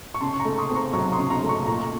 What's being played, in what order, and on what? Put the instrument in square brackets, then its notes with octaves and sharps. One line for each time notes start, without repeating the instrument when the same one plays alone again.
[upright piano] C#6
C#3 A5 C6
A#5 C#6
A3
C6 D#6
C4
A#5 C#6
F#3 A#5 C#6
C6 D#6
C#3
A#5 C#6
A3
A#5 C#6
A#2 A#5 C#6